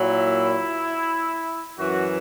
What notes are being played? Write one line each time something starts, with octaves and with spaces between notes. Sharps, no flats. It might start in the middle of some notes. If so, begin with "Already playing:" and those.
Already playing: A#2 F#3 E4
F#2 E3 F#4